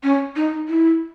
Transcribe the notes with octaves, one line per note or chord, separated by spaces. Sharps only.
C#4
D#4
E4